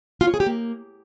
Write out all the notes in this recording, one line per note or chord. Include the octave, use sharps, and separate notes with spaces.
F4
C#5
G#4
G4
A#3